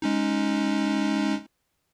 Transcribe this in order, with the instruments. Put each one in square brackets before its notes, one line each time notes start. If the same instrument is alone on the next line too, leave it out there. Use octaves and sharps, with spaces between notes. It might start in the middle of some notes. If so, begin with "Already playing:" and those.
[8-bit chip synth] G#3 C#4 D#4